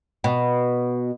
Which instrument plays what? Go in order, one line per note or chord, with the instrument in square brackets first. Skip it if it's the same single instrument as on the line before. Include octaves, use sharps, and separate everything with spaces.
[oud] B2